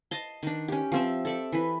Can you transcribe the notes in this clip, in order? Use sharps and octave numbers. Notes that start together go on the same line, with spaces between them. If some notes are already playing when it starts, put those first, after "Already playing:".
D#5 A5 C6
D#3 D4
C#4 G4
F3 C4 E5
A4 D5 E5
E3 B4